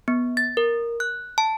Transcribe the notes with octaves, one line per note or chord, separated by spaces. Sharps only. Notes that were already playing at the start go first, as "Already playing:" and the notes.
B3
A6
A#4
F#6
A5